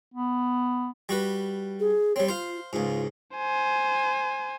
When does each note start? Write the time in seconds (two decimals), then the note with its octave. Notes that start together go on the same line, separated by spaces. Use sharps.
0.14 B3
1.09 G3 F#4 B4
1.80 G#4
2.16 G3 C4 C#5
2.29 F4 C5 F5
2.73 C#2 G#2 F4
3.36 C5 G#5